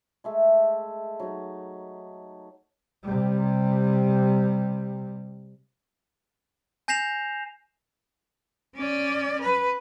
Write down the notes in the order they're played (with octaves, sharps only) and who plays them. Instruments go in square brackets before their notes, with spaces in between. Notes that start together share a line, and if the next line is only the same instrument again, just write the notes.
[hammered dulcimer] G#3 A3 E5
F#3 D#4
[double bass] C3 G3
[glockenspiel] G#5 G6 A#6 C7 E7 F7
[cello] C#4 D5
B4